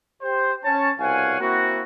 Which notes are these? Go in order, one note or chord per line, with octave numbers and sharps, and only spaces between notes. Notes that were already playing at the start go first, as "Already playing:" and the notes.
G4 C5
C#4 C#5 A5
C2 B2 C#5 F5 F#5 G#5
A#3 C4 E4 F#4